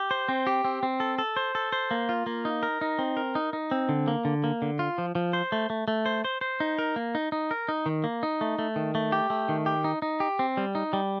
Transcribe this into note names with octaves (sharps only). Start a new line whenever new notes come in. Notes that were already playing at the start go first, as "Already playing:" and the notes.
Already playing: G4
C5
C4
G4
C4
C4
A4
A4
C5
A4
C5
A#3
F4
A#3
D#4
A#4
D#4
C4
A#4
D#4
D#4
C4
D3
A#3
D3
A#3
D3
F4
F3
F3
C5
A3
A3
A3
C5
C5
C5
D#4
A#4
A#3
D#4
D#4
A#4
D#4
D#3
A#3
D#4
A3
A3
D#3
A3
G4
A3
D#3
G4
D#4
D#4
G4
C4
G3
D#4
G3